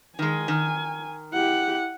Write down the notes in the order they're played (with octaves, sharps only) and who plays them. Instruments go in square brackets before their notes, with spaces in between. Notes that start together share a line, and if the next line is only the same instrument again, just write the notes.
[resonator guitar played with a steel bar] D#3 G#3 [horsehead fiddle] G#5
[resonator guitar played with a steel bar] D#3
[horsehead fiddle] E4 G4 [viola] F#5